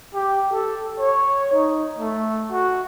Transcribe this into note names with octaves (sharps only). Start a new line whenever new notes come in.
G4
A4
C#5
D#4
A3
F#4